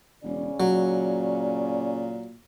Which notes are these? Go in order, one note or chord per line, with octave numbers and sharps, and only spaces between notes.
E1 C#3 C#4 D5
A#2 F#3